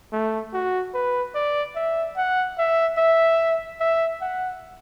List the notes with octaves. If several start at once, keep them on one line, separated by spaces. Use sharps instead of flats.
A3
F#4
B4
D5
E5
F#5
E5
E5
E5
F#5